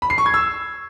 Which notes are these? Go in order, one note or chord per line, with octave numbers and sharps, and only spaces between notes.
B5
C7
C#6
G#6
E6